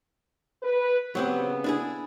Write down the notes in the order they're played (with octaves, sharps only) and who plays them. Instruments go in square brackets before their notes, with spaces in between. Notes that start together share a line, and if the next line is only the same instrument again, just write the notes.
[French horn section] B4
[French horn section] C#3 B3 [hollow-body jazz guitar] F#3 C4 G4
[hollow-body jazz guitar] D4 E4 G#4